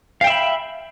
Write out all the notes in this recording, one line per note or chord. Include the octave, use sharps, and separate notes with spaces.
E5 F5 G5 B5